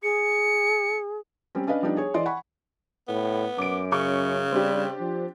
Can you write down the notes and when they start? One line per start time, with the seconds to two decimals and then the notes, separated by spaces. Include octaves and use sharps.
0.03 G#4 C#7
1.55 G3 C4 C#4
1.67 C#4 D4 B4 D#5 F5
1.82 F3 G3 B3 D4 D#4
1.97 G#4 C#5
2.14 E3 D5 D#5 C6
2.26 F#5 G#5 B5 C#6
3.08 A2 B3
3.58 F#2 D6 D7
3.92 C#3 C#6
4.52 G3 C4 D4 G4
5.00 F3